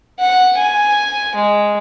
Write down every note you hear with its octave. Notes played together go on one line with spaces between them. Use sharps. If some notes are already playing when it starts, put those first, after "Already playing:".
F#5
G#5
G#3